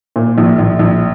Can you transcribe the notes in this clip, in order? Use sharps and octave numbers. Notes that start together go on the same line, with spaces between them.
A#2
A#1
A#1
A#1